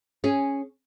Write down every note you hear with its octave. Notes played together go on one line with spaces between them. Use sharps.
C#4 G#4